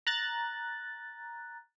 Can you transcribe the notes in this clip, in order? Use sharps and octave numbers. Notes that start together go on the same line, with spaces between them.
A#5 F#6 A6